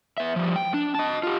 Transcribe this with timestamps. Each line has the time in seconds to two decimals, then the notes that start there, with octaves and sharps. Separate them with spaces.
0.18 B3 E5
0.36 F3 G3
0.56 G5
0.74 D4
0.95 D#5 A5
1.23 F4 G4